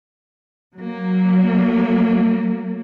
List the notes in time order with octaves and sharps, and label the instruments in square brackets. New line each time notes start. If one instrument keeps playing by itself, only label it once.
[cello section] F#3 A#3